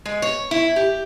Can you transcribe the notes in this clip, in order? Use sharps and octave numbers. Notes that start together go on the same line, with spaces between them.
G#3
C#5
E4
G4